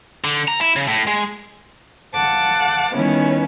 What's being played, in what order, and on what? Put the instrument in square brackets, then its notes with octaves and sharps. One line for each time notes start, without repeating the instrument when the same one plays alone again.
[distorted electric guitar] D3
A#5
E4
C#3
A2
G#3
[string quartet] F5 F#5 A5 D6
D#3 G3 B3 C#4 E4 B4